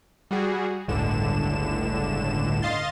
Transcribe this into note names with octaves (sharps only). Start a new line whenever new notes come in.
G3 F#4 G#4
G1 C#2 A2 D3 E7
D#5 F5 C6 A6